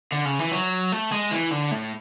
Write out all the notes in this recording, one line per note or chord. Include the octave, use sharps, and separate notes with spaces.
D3
C#3
E3
F#3
A3
G#3
E3
D3
A2